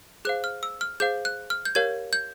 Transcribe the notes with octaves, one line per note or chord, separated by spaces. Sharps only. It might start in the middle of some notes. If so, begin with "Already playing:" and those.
G#4 C5 F5 F#6
F6
E6
F6
G#4 C5 F5 G6
F#6
F6
G6
G4 A#4 C#5 F5 G#6
G6